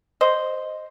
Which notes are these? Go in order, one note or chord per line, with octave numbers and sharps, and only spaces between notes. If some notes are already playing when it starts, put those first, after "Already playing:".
C5 D#5